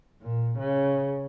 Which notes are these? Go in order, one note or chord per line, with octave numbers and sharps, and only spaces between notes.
A#2
C#3